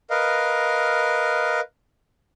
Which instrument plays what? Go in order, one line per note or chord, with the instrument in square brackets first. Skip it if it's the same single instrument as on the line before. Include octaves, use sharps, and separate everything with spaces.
[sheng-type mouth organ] A#4 B4 D#5 F5